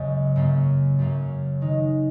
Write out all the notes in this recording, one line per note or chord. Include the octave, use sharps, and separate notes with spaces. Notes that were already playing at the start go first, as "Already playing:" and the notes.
Already playing: F#2 C#3 G#3
F#2 C#3 A#3 C#4
F#2 C#3 A#3 C#4
D#3 G#3 D#4